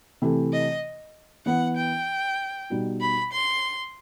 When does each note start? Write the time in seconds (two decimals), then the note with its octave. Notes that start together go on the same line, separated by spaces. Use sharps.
0.22 C3 E3 A3
0.53 D#5
1.46 E3 B3 E4 F#5
1.76 G5
2.70 B2 G3 D#4 F#4
3.01 B5
3.32 C6